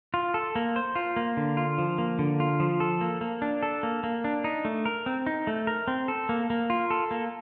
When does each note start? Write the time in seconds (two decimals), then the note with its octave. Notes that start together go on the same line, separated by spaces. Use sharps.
0.14 F4
0.34 A4
0.56 A#3
0.76 C5
0.96 F4
1.16 A#3
1.37 D3
1.57 F4
1.78 F3
1.98 A#3
2.19 D3
2.40 F4
2.60 F3
2.80 A4
3.01 A#3
3.21 A#3
3.42 D4
3.63 A4
3.83 A#3
4.04 A#3
4.24 D4
4.44 D#4
4.65 A3
4.85 A#4
5.06 C4
5.26 D#4
5.47 A3
5.67 A#4
5.88 C4
6.08 A4
6.29 A#3
6.50 A#3
6.70 F4
6.91 A4
7.11 A#3